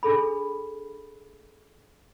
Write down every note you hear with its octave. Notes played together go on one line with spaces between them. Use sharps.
D4 G#4 A4 B5